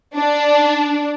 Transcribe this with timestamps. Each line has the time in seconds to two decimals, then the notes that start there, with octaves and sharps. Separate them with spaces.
0.15 D4